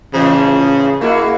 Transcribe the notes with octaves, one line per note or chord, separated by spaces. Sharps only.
A2 C#3 E3 F3
G#3 A#3 E4 F#4